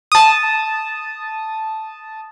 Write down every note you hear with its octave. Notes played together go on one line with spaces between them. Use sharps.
A5 D#6